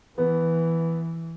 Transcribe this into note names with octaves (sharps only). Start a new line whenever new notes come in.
E3 B3